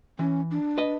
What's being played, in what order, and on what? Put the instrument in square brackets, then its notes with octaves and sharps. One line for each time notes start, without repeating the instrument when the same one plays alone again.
[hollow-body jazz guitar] E3 [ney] C#4
[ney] D4
[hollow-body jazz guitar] B4 D#5